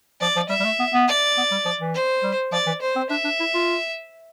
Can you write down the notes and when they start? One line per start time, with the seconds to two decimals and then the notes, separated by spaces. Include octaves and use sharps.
0.21 F3 D5
0.36 F3
0.49 G3 E5
0.60 G3
0.65 A3
0.79 B3
0.93 B3
1.08 D5
1.37 B3
1.51 G3
1.65 F3
1.81 E3
1.95 C5
2.23 G3
2.52 F3 D5
2.66 E3
2.82 C5
2.96 C4
3.10 D4 E5
3.24 D4
3.40 E4
3.54 F4